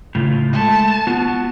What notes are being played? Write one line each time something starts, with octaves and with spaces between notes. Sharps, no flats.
A2 C#3 F4
G#3 A3 A5
B3 F4 F#4